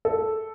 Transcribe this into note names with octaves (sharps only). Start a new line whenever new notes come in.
A4